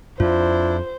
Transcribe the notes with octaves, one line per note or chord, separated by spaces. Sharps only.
F2 D4 E4 F4 C5